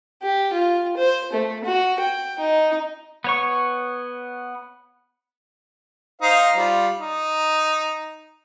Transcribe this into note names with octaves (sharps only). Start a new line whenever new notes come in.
G4
F4
C5
A3
F#4
G5
D#4
B3 C#5 C#6
D#4 C5 F5
G3 F4
D#4